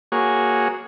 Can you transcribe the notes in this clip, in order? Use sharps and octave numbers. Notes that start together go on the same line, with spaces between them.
A#3 F#4 G#4 C#5